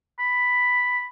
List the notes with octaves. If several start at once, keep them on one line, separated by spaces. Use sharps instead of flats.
B5